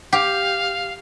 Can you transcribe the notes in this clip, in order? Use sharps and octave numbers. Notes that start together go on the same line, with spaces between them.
G4 F5